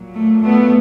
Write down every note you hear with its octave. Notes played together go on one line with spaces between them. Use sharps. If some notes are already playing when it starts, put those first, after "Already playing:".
Already playing: A#2 F#3
A3
A3 B3